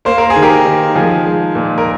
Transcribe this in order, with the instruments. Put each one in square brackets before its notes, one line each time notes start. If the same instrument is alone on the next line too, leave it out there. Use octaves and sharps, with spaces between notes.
[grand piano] A#3 C5
A#4
G#4
D#3
G4 A#4
D#3
F3 G#4
G#3
A#2
A#4